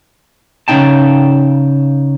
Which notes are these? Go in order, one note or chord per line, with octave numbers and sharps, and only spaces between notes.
C#3 B3 D#4 G5 A5